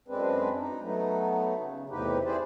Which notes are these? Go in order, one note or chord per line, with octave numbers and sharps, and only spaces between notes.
F#2 G#3 C4 D4 B4
D#4
F#3 A3 B3 D#4
C#3
E2 A2 C3 D#4 G4 B4
E4 G4 G#4 B4 C5 D5